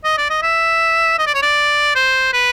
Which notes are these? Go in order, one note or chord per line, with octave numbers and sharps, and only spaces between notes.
D#5
D5
D#5
E5
D#5
D5
C#5
D5
C5
B4